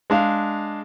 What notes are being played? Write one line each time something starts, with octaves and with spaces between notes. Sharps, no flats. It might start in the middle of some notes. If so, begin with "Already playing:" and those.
G#3 D4 F5